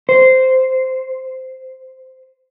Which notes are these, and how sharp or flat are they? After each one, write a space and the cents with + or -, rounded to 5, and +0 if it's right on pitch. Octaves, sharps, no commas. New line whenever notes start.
C5 -10